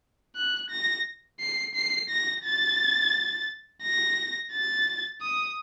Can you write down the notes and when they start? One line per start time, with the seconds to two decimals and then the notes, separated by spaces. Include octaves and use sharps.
0.36 F#6
0.70 A#6
1.40 C7
1.75 C7
2.10 A#6
2.44 A6
3.83 A#6
4.52 A6
5.21 D#6